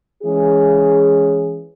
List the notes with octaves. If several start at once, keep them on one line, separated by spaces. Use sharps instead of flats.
E3 G#3 C#4 G#4